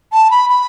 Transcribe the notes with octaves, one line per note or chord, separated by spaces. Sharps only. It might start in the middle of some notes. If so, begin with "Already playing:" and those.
A5
B5
B5